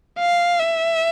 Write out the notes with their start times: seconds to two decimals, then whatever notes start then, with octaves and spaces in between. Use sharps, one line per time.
0.19 F5
0.59 E5